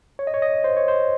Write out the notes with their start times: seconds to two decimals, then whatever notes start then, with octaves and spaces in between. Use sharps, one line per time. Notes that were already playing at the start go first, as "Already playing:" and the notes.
0.19 C#5
0.27 D#5
0.34 C#5
0.42 D#5
0.64 C5
0.77 C#5
0.88 C5